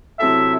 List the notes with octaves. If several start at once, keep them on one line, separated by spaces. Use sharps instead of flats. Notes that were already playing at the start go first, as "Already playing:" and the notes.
C3 F#3 C4 E4 A4 E5